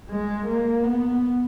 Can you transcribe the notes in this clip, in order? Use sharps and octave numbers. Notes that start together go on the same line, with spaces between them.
G#3
A#3
B3